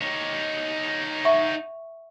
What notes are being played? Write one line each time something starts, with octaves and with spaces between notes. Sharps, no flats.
D#4 C#5
E5 F#5 C#6